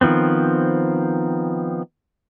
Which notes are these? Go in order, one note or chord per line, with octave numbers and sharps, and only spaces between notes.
D#3 F3 B3 C4